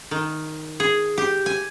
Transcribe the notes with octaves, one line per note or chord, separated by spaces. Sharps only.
D#3
G#4
G4
G#5